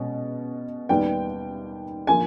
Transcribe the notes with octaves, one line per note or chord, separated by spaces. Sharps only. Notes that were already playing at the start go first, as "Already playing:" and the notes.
Already playing: B2 G#3 C#4
D#2 D#3 G3 B3 G5
D3 F3 A#3 G#5